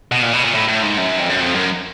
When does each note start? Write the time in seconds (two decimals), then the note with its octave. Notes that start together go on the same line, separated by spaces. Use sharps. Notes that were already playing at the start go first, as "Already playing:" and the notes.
0.12 B2
0.23 A#2
0.33 B2
0.44 A#2
0.55 A2
0.68 A2
0.83 G#2
0.98 F#2
1.19 F2
1.30 F#2
1.40 F2
1.55 F#2